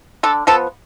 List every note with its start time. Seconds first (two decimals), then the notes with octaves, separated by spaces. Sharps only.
0.23 D3 A4
0.47 F3 B3 A4